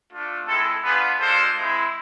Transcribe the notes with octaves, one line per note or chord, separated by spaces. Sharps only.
A3 D4 F4
G#3 C4 E4 A4
B3 D4 F4 G#4 B4
G#3 D4 F4 A4 C5
G#3 C4 E4